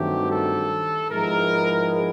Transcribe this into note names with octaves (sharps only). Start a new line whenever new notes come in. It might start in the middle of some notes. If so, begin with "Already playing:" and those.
Already playing: G2 D#3 F#3 A3 C4 G4
A4
G#2 F3 G#3 B3 E4 A#4